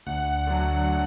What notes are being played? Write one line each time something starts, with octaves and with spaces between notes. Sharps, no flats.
D2 F#5
D3 F#3